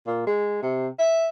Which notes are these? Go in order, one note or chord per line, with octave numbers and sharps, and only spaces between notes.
A#2
G#3
C3
E5